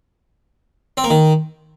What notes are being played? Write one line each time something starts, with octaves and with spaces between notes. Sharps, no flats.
C4
A#3
D#3